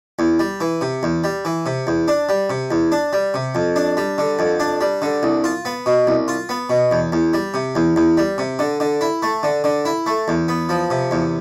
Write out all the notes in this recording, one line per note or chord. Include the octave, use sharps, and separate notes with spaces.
E2
G3
E3
C3
E2
G3
E3
C3
E2
D4
G3
C3
E2
D4
G3
C3
F2
D4
G3
D3
F2
D4
G3
D3
C2
F4
B3
B2
C2
F4
B3
B2
E2
E2
G3
C3
E2
E2
G3
C3
D3
D3
E4
A3
D3
D3
E4
A3
E2
B3
F3
C3
E2